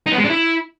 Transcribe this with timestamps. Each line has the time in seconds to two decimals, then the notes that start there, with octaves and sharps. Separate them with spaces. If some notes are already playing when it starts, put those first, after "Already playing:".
0.06 D#4
0.12 B3
0.18 G#3
0.24 D4
0.30 E4